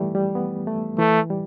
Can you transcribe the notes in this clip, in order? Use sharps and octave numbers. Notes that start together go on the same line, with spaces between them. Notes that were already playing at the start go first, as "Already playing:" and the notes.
Already playing: E3 G3 A3
G3
B3
A3
E3 A3
G3